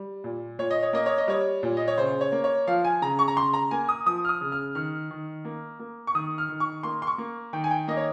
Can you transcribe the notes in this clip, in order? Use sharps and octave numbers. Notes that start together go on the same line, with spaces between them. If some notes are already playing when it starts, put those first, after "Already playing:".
Already playing: G3
A#2
A#2 C#5
D#5
C#5
A#3 D#5
C#5
D#5
G3 C#5
A#2
D#5
C#5
C#3 C5
C#5
A#3
C#5
F3 F5
G#5
C#3 A#5
C#6
A#5
C#3 C6
A#5
A#3 G#5
D#6
F3 D#6
F6
D#6
C#3
F6
D#3 F6
D#3
A#3
A#3
C#6
D#3 D#6
F6
D#3
C#6
A#3 C6
C6
C#6
A#3
D#3 G5
G#5
G5
A#3 D#5
C#5